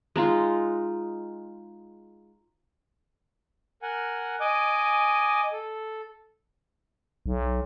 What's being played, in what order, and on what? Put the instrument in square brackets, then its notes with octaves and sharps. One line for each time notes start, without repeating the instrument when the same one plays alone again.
[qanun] G#3 D#4 F4
[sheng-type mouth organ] A#4 F#5 G#5
D#5 G#5 D6
A4
[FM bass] B1